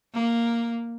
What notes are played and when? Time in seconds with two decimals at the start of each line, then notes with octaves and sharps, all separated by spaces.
0.14 A#3